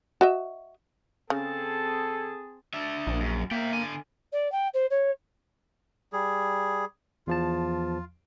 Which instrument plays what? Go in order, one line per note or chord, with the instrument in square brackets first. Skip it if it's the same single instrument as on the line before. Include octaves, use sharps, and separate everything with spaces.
[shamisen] F#4 D#5 E5
[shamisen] C#3 [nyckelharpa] C4 A5 [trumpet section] G#4 [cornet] A4
[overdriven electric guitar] D4 E5
[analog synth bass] A#1
[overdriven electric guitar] F#2
[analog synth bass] A#3 [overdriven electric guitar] E5 G5
[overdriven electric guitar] D3 G#5
[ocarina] D5
G5
C5
C#5
[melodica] G3 G#4
[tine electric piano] E2 F3 A5 [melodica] F4